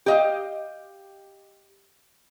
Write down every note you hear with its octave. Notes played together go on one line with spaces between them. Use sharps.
G4 D#5 F5